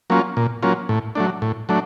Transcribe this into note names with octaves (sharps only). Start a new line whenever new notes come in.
F#3 A#3 C#4 F4
A#2
F#3 A#3 C#4 F4
A2
F#3 A3 D4
A2
F#3 A3 D4